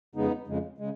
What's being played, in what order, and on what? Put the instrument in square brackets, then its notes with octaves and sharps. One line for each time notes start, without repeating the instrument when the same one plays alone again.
[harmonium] F2 C#3 G#3 B3 D#4
F2 C#3 G#3
C#3 G#3